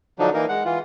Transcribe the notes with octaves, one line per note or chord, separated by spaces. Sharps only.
D3 F3 F#3 D4 D#4
E3 A#3 D#4 A#4
G#3 F#5
E3 F4